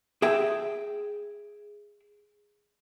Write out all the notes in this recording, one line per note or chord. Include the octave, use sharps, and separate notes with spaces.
G#4 E5 G5